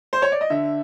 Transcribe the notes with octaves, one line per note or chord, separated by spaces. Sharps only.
C5
C#5
D5
D#5
D3 E5